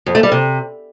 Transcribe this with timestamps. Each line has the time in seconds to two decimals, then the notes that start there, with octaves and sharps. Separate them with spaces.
0.06 F2
0.15 A3
0.23 G3
0.32 C3